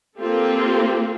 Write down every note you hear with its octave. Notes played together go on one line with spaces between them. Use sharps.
A#3 C4 F4 G4 A4